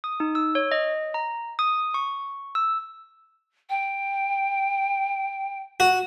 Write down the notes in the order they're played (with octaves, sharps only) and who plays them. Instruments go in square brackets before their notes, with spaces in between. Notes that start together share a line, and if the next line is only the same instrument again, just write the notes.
[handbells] D#6
D#4
E6
C#5
D#5
A#5
D#6
C#6
E6
[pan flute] G5
[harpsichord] F#4